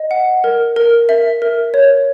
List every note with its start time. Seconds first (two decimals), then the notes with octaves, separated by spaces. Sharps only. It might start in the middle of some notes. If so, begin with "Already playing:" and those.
Already playing: D#5
0.11 F#5
0.44 A#4
0.76 A#4
1.09 E5
1.42 A#4
1.74 C#5